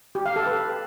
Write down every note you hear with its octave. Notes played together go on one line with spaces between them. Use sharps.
G4
F5
A4
B4